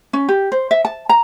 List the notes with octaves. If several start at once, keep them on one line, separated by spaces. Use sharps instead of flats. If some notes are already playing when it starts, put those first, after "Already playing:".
C#4
G4
C5
E5
A5
A#5